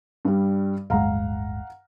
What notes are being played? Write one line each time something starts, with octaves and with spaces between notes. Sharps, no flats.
G2 G3
D1 G1 G#3 F5 F#5 A#5